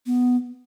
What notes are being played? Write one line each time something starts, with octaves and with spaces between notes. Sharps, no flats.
B3